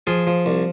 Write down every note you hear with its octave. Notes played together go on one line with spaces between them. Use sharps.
F3 F4 G#4
F3
C2